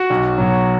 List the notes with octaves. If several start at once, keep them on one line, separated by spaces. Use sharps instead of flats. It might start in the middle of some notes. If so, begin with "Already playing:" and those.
Already playing: F#4
B1
B2 F#3